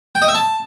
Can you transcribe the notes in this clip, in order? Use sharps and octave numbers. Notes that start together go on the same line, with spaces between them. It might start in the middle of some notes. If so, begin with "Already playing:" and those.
G5
D#5
E5
A5